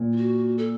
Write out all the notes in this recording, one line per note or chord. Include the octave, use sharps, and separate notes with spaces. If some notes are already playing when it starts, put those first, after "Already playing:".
Already playing: A#2
F4
F#4
A4